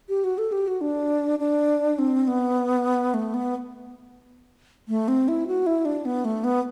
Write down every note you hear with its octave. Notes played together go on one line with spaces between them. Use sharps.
G4
F#4
A4
G4
F#4
D4
D4
C4
B3
A3
B3
A3
C4
E4
F#4
E4
D4
B3
A3
B3